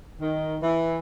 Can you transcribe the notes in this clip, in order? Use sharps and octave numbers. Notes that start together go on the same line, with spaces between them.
D#3
E3